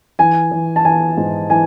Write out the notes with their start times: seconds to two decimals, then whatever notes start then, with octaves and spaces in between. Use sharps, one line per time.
0.19 E3 G#5
0.51 E3
0.76 A5
0.85 E3 G#5
1.17 G#2
1.50 E3 G#5